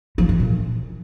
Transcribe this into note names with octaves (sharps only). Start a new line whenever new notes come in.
F3
E3
A#2